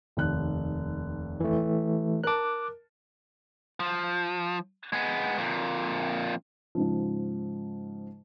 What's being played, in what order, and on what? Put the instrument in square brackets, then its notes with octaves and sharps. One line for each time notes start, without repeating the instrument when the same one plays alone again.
[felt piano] F1 D#2 F#6
[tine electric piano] E3 A3
[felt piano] A#4 A5 [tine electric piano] D6 F#6
[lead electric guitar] F3
G#3 B3
F2 A#2
[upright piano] G#2 C#3 F3